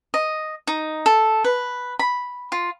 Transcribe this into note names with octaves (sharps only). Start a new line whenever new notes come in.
D#5
D#4
A4
B4
B5
F4